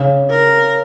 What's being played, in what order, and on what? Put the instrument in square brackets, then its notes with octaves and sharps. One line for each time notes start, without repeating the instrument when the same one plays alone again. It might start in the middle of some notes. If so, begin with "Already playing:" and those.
Already playing: [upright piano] C#3
[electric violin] A#4